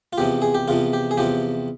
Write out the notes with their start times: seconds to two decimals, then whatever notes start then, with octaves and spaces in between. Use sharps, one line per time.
0.13 F4
0.18 E2 C3 F3 G4
0.42 G#4
0.54 G4
0.68 E2 C3 F3 F4
0.93 G4
1.11 G#4
1.17 E2 C3 F3 G4